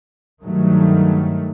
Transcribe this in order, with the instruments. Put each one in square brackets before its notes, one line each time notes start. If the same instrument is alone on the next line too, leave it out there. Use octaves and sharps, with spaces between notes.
[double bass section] G2 D#3 F#3 A3